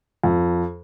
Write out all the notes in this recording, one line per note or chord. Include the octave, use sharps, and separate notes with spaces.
F2